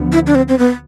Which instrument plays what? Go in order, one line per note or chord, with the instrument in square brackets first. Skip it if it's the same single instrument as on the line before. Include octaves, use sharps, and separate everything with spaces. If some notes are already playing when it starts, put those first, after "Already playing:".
Already playing: [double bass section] D2 D3 F3 B3
[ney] E4
D4
C4
C4
B3